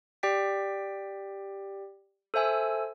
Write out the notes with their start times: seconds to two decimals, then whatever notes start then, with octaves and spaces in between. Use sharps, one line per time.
0.23 G4 D5 G5 B6
2.34 A4 C5 E5 G#5 E6